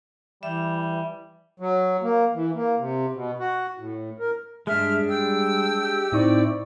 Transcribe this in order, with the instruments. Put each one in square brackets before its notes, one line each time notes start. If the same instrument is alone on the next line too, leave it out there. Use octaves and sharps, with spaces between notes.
[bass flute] E3 [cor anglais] G3 [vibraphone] E5
[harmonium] F#3
A#3
E3
A#3
C3
B2
F#4
A2
A#4
[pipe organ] G2 [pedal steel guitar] G#3 D4 [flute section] E5 F6
[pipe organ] G3 [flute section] G5 E6
[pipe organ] G4
[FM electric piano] A2 D#4 C#6 [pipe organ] C4 E4 D5